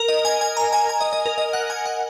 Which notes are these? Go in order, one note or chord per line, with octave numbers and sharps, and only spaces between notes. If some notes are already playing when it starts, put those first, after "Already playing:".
Already playing: A#4
D#5
G#5
G#5
A#5
G#5
G#5
D#5
D#5
A#4
D#5
F#5
G#5
F#5